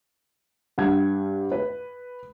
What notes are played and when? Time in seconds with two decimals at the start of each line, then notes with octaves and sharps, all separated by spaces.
0.78 G2 F#5 G#6
1.52 B4